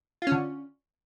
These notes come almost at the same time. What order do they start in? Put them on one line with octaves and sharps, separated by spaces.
F4 C#4 D3